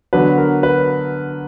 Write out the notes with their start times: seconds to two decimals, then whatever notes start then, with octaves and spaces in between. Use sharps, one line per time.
0.13 D3 F#3 B3 D4 B4
0.38 A#4
0.63 B4